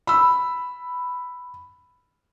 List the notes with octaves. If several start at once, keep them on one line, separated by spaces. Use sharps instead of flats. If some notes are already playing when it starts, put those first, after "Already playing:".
B5 E6